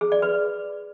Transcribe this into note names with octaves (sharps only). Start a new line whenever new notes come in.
G#4
D5
B4